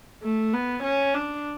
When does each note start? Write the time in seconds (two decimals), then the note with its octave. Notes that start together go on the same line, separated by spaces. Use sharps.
0.22 A3
0.53 B3
0.83 C#4
1.14 D4